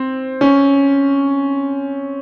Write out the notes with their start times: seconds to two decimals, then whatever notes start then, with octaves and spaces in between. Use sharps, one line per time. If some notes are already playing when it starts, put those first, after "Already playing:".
Already playing: C4
0.41 C#4